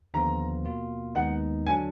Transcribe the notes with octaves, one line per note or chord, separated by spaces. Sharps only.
D#2 D3 F3 B3 F4 A#5
B2 A#3 F4
D#2 D#3 G#3 B3 D#4 F#5
D3 F#3 D4 G#5